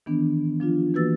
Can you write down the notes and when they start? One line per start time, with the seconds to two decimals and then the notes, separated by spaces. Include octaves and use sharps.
0.06 D#3 E3 B3 D4
0.60 F3 D4 F4
0.94 E3 A#3 F#4 B4 E6 A6